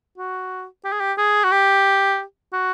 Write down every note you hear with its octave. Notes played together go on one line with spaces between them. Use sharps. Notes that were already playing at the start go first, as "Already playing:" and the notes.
F#4
G4
G#4
G4
G#4
F#4
G4
F#4